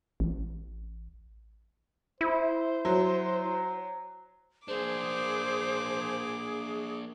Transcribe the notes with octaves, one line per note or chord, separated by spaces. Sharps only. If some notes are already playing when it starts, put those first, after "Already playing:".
A1
E4 C5
F#3
A#3 D4 G#4 C5 D6